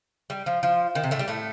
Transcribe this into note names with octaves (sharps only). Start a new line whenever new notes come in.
G3
F3
F3
D#3
C3
A2 A3
G3
A2 A3